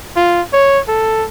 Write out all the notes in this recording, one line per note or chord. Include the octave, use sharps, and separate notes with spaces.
F4
C#5
A4